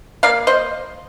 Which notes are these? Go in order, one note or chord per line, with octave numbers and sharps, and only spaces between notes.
A#3 D5 F5
C5 D#5